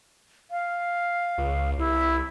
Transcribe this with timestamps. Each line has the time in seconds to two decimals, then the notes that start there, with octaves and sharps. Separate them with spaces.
0.51 F5
1.38 C#2
1.78 C2 E4